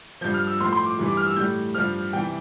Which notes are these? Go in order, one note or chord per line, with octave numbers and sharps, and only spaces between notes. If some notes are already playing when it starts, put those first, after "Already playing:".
G2 F3 G6
F6
E6
A2 F3 C6
C6
D6
G2 E3 G3
D6
F6
E6
A2 G3 G6
G2 F3 F6
C3 E3 G3 G5